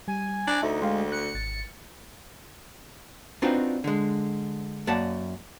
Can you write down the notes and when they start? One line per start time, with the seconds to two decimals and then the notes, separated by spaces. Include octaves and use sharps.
0.08 G3 G#5
0.47 D4
0.63 D2 D#4 E5
0.82 G#3 F5 G5 C6
1.12 F#6 C#7
1.35 G#1 A6
3.42 C4 D4 D#4 F4 F#4 B4
3.84 D3 G#3
4.87 F#2 A#3 D5 F#5 A5